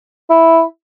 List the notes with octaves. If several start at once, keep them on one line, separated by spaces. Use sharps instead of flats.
E4